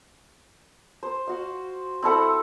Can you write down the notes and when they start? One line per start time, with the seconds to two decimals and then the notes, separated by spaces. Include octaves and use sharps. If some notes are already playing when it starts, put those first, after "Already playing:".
1.03 C5
1.27 F#4 F5
2.02 C4 E4 A4 F#5